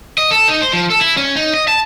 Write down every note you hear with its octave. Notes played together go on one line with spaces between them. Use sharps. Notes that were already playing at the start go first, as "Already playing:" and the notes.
D#5
A4
D#4
C5
F3
A4
E4
C#4
D#4
D#5
A5